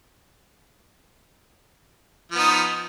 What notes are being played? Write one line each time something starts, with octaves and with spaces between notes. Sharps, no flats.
F3 B3 D#4